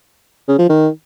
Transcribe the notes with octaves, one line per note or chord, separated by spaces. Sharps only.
C#3
F3
D#3